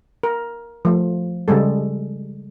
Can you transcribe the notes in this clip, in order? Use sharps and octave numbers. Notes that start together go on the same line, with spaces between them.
A#4
F3 A3
C#3 G3 G#3 A4